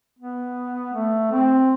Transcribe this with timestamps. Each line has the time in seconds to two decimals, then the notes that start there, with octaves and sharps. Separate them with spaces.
0.19 B3
0.93 A3
1.31 C4